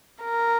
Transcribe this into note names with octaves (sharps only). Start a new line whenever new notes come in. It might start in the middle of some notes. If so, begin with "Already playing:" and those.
A#4